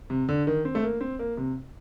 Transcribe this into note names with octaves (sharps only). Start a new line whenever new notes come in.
C3
D3
D#3
C4
A3
A#3
C4
A#3
C3